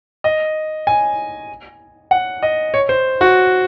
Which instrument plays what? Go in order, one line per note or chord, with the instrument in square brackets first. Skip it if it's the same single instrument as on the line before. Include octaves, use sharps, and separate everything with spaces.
[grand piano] D#5
G#5
F#5
D#5
C#5
C5
F#4